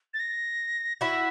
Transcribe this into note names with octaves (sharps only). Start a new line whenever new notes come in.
A6
A#6
E4 F#4 B6